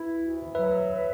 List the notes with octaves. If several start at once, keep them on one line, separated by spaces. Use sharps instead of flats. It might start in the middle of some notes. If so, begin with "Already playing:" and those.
Already playing: E4 B4 E5
D2
F#3 B4 E5
B4